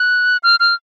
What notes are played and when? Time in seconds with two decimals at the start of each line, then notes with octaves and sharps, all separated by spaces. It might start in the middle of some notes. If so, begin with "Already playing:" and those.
Already playing: F#6
0.43 F6
0.60 F6